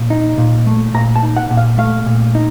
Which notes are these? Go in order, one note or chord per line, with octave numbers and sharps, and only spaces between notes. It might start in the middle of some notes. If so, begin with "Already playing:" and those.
Already playing: A#2
D#4
A#2
A3
A#2 A#5
A5
D#4
F#5
A#2
F5
A3 F5
A#2
D#4